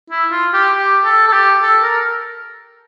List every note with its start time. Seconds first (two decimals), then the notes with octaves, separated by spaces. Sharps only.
0.10 E4
0.31 F4
0.54 G4
0.75 G4
1.05 A4
1.28 A4
1.33 G4
1.62 A4
1.83 A#4